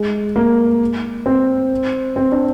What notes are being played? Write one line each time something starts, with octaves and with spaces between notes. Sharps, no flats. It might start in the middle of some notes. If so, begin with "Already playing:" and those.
Already playing: G#3
A#3
C4
C4
D4